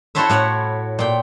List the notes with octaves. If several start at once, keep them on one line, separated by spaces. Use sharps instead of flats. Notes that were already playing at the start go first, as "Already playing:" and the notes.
E4 F#4 A4 C5 C#5 E5
A2 C#5 F#5
A#2 G5